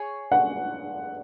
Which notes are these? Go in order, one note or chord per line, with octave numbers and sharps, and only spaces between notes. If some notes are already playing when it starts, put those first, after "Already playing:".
Already playing: G#4 C#5 G#5
F#5